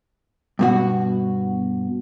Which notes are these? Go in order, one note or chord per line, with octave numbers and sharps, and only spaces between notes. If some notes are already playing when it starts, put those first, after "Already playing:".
G2 B2 F#4